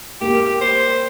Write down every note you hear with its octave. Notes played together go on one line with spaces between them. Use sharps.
A#3 G4
C5